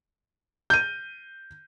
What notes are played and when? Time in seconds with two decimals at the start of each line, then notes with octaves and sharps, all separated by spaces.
0.70 G6 D#7